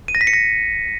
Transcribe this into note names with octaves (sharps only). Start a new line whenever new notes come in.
D#7
A#6
B6
C#7
A#6